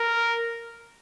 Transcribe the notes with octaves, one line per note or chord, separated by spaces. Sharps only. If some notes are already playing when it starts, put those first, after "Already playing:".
Already playing: A#4